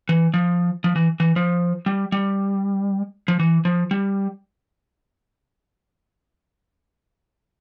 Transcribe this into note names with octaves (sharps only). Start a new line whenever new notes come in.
E3
F3
F3
E3
E3
F3
G3
G3
F3
E3
F3
G3